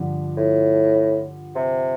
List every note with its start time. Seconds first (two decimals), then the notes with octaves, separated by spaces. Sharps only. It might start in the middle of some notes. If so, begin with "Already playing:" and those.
Already playing: G2 D3 F3
0.37 A2
1.55 C3